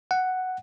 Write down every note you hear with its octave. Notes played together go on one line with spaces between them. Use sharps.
F#5